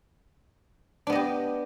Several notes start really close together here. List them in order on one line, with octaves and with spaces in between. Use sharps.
D4 B3 D#5 G4